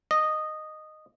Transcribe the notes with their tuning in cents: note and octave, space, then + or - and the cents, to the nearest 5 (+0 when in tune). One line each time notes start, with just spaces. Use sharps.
D#5 -10